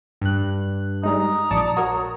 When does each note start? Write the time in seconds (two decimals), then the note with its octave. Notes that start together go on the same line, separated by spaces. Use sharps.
0.21 G2 F#6
1.03 G3 G#3 D#4 A#5 D#6
1.51 A#1 D5 A5 C#6 C#7
1.77 F#4 A#4 C#5